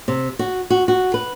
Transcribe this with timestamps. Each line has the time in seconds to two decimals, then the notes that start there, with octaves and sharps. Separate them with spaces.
0.08 C3
0.39 F#4
0.70 F#4
0.88 F#4
1.14 B4